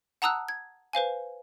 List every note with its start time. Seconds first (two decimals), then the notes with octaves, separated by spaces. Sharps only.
0.22 F#5 A5 A#5 D#6 E6 F#6
0.49 G#6
0.93 B4 C5 F5 G#5